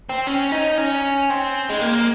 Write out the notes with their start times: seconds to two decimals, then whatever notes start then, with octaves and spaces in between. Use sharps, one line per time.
0.09 C4
0.27 C#4
0.52 D#4
0.78 C#4
1.30 C4
1.69 G#3
1.81 A#3